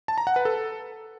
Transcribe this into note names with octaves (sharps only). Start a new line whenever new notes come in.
A5
A#5
F#5
B4
A4